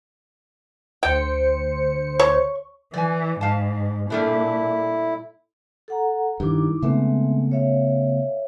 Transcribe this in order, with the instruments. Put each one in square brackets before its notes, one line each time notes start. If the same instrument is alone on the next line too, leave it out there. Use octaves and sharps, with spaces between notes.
[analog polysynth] D2 C5 C#7 [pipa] G5
[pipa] C#5
[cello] E3 [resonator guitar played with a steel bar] D5 G#5
[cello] G#2 [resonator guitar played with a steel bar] F5 A5
[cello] A#2 [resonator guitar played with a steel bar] G3 A3 D4 [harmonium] E4
[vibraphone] A4 F#5 A#5
[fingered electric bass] G2 D#3 [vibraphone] D#4 E4 D6
[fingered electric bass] C#3 A3 B3 [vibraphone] G#3 C4 E5
[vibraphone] C#5 E5 F5